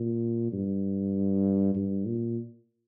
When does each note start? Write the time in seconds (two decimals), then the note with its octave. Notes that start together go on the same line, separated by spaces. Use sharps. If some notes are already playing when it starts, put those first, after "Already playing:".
Already playing: A#2
0.52 G2
1.75 G2
2.06 A#2